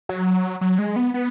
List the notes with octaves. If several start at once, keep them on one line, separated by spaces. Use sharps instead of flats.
F#3
F#3
G#3
B3
B3